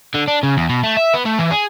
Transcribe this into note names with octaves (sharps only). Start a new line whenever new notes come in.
D3
D4
C#3
E2
B2
A3
E5
B3
A3
E3
G#4